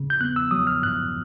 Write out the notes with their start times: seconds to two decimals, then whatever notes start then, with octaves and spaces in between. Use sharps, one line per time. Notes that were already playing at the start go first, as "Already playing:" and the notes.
Already playing: C#3
0.10 G6
0.21 B3 F#6
0.36 E6
0.51 F#3 D#6
0.67 F6
0.83 G2 F#6